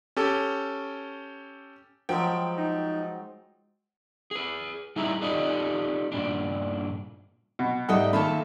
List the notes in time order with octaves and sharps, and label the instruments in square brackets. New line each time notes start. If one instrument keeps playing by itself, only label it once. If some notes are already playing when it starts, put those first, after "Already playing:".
[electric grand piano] C#4 G4 A4
[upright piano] F3 [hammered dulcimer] F#3 G#3 C5 [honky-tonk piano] G5
[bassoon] D#4
[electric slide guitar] G#4 B4
G3 D#4 E4 G#4 E5 A#5
D#4 F4 G4 A4 D5 D#5
G2 A#2 D4
[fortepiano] B2
[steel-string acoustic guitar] G#2 G3 G5 [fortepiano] A3 D#5 F#5
[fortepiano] A#2 A3 B5 [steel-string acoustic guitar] D#3 A#3 A4